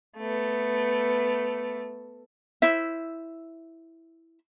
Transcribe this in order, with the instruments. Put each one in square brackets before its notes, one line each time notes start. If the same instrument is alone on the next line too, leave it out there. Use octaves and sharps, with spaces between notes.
[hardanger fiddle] A3 B3
[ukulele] E4 C5 E5